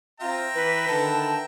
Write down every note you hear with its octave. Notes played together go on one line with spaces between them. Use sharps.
C4 F4 E5 G5 A#5
E3 B4
D3 D#3 B4 A5